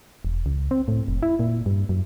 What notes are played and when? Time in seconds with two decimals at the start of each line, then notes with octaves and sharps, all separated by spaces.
0.25 E1
0.46 C#2
0.71 C4
0.88 A2
1.08 F1
1.23 E4
1.39 A#2
1.66 G2
1.89 F#2